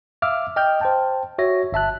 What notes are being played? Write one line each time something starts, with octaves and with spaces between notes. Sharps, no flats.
E5 F5 D6 E6 F6
D#5 G5 D6 F6 G6
C5 G5 A5
F#4 C#5 E5 A#6
G1 E5 A5 F#6